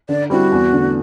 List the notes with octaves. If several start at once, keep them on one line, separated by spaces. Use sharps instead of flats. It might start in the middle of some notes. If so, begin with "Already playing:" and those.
D3 D5
G3 C4 E4 F#4
E2
D3 A3